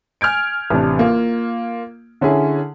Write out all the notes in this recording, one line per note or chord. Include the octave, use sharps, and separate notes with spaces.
G#5 F6 G6 G#6 D7
A1 C3 D4
A#3 F4
D3 C#4 E4 G#4